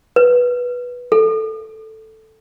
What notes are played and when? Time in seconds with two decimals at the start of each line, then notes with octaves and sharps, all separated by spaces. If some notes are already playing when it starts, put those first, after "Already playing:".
0.16 B4
1.12 A4